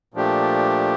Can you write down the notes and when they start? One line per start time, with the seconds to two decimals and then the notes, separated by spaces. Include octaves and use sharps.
0.14 A#2 F3 A3 D4 G4